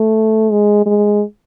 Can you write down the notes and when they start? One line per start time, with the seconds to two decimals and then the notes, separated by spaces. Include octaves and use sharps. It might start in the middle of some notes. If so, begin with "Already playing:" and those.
Already playing: A3
0.52 G#3
0.86 G#3